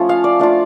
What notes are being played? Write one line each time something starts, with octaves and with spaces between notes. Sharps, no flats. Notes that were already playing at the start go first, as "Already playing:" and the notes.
Already playing: F3 A3 C#4 F4
F5
D5
A3 D4 F4